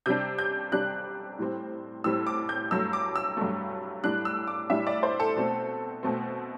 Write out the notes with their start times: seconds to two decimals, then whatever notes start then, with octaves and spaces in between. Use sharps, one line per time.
0.06 C3 G3 D4 G6
0.39 G6
0.72 C3 G3 D4 F#6
1.38 A2 G3 C4
2.04 A2 G3 C4 E6
2.27 D6
2.49 G6
2.71 G2 F#3 A3 E6
2.93 D6
3.16 E6
3.37 G2 F#3 A3
4.04 A2 G3 D4 F#6
4.25 E6
4.48 D6
4.70 A2 G3 D4 E5
4.87 D5
5.03 C5
5.20 A4
5.36 B2 A3 C4
6.03 B2 A3 C4